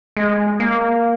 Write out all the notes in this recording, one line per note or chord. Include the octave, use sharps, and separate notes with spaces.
G#3
A#3